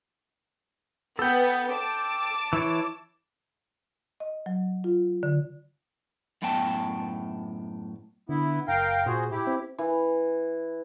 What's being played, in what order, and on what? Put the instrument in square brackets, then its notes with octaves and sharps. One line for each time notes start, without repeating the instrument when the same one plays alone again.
[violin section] B3 [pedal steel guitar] A4 G5
[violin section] A5 D6
[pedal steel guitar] E3 E4 C#5
[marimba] D#5
F#3
F4
D3
[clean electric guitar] F#2 A2 B3 G5 A5
[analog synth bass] D3 [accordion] B3 E4
[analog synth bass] F#1 [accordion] A#4 F5 G5
[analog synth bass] A#2 [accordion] F#4 G#4 C5
[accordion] E4 G4
[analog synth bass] C4
[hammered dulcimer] E3